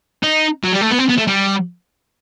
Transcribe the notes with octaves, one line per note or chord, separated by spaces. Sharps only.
D#4
F#3
G3
A3
B3
C4
B3
A3
G3